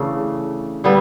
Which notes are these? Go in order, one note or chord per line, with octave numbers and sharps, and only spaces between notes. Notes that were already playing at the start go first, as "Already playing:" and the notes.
Already playing: C#3 E3 A3 D4
D3 G3 B3